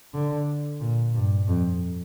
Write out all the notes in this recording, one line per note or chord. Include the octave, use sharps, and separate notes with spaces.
D3
A#2
G2
F2